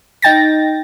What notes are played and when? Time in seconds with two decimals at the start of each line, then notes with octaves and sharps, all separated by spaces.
0.22 D#4 G5 A6 A#6